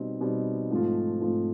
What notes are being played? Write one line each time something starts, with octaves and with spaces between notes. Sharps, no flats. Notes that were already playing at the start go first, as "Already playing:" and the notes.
Already playing: B2 G3 C4 D#4
B2 G3 C4 D#4
G#2 F3 A3 C4 F4
G#2 F3 A3 C4 F4